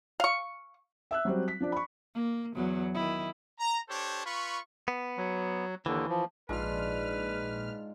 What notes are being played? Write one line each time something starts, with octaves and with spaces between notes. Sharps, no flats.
F5 C#6
E5 E6 F#6
F#3 G3 C4
B6
F3 D4 D5
B5 C#6
A#3
E2 F#3
D#3 E4
A#5
D4 G4 A4 C5 C#5
F4 B4 B5 C#6
B3
F#3
D#2 D3 E3
F3
A#1 G#2 D4 F4 B4 F5 F6